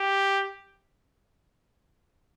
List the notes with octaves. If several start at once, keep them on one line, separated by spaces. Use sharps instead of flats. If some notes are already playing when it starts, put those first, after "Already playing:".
Already playing: G4